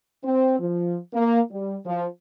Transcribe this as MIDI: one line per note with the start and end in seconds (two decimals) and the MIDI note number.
0.24 0.56 60
0.60 0.98 53
1.14 1.40 58
1.51 1.77 55
1.86 2.05 53